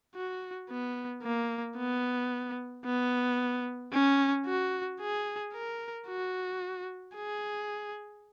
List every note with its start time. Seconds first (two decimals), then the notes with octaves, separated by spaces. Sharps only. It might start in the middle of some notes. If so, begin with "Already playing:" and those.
0.16 F#4
0.70 B3
1.23 A#3
1.77 B3
2.85 B3
3.93 C#4
4.46 F#4
5.01 G#4
5.53 A#4
6.08 F#4
7.16 G#4